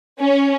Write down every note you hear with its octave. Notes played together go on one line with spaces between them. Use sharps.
C#4